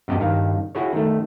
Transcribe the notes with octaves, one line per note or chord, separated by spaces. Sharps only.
F#2 B2 G4 D#5 A5
G2 D#3 F5
E4 F#4 G#4 C#5
D#3 A3